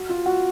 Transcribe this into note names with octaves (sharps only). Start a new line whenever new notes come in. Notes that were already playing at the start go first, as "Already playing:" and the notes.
Already playing: F#4
F4
F#4